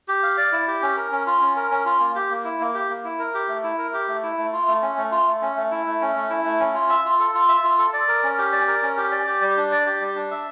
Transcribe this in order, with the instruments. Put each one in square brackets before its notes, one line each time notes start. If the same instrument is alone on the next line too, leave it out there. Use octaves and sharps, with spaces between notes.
[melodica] G4
F5
D5
E4
G4
C#4
A#4
C#4
F4
C#4
A#4
C#4
F4
A#3
G4
A#3
E4
A#3
G4
A#3
E4
A#4
G4
A3
E4
A#4
G4
A3
E4
A3
F4
A3
C#4
A3
F4
A3
C#4
A3
E4
A3
C#4
A3
E4
A3
C#4
F4
E5
F4
A4
F4
E5
F4
A4
D5
A#4
C#4
G4
D5
A#4
C#4
G4
D5
G4
G3
D4
D5
G4
G3
D4
E5